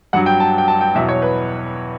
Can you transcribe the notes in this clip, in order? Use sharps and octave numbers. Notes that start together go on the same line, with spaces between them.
G2 F#3 F#5
G5
A5
G5
A5
G5
E2 B2 F#3 E5
C#5
B4